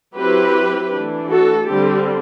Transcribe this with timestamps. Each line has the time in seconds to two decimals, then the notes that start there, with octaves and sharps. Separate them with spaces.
0.15 F#3 C4 E4 G4 B4
0.91 E3 A3 D4
1.29 F#4 A4
1.67 D3 G3 C4 G4